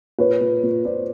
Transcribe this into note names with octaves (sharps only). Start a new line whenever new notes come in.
A#2 B4 C#5
A#2
A#2
A#2 C5 D5